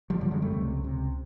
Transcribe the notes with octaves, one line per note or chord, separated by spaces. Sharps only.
F3 G3
F#2 D3 F3 G3
F#3 G#3
G3 A3
C#2 C3
C#2 C3